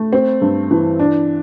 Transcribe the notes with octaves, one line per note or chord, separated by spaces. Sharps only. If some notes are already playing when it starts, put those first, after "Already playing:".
Already playing: A3
C4
G2
E3
D4